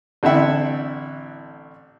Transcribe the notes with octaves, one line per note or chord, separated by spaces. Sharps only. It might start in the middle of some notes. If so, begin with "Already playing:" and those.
A1 D3 C4 E4 E5 F#5